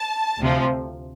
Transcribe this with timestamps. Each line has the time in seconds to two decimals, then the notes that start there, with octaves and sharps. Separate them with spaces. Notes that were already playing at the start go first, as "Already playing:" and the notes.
Already playing: A5
0.39 D2 C3 F3